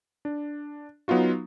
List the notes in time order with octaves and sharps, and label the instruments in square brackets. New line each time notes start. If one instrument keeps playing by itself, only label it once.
[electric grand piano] D4
F#3 B3 D#4 F4 F#4